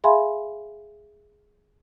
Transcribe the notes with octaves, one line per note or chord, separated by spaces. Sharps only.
G#4 E5 F5 G#5 B5 C6